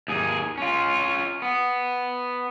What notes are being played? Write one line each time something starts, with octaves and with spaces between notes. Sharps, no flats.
D#2 G#4
C#4 F4
B3